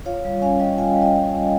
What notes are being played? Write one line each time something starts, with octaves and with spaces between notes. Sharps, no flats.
F4 C#5 F5
G3
C#4 F5 G#5
G3 D#5 G5
F4 F5 G#5
G3
D#5 G5